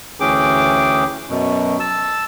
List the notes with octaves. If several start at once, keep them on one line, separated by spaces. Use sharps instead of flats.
D2 E3 C#4 G#4 G5 D6
F#2 B2
A5 E6